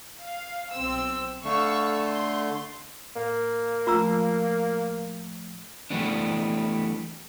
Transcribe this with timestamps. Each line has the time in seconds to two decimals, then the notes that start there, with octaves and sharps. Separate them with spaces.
0.20 F5
0.73 B1 C4 E6
1.44 D3 A3 F5 C#6 E6
2.07 C6
3.16 A2 A#3
3.87 F3 A3 F4 A#5 E6
5.90 E3 F3 G3 A3 B3 D4